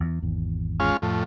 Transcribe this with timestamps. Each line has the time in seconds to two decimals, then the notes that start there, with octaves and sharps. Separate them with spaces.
0.01 E2
0.23 G#1 E2
0.80 G#3 C#4 F4
1.02 F2 A2